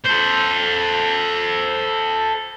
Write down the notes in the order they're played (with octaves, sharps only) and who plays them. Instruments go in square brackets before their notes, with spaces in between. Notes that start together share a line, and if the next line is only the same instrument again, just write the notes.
[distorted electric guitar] A4 C5